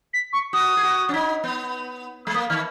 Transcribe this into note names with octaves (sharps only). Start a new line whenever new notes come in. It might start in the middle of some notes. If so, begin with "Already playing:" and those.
B6
C#6
F#4 D#6
G#4
F#4
C#4
D#4
B3
G#3
A#3 D#6
D#3 F6